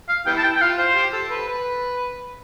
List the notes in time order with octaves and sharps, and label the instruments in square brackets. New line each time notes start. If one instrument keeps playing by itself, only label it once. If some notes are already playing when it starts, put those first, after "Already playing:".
[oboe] F5
[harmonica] G3 B3 E4 [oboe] G5
[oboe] A5
G5
G5
[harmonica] F4 [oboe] F5
[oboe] C5
[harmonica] G4
A4
B4
B4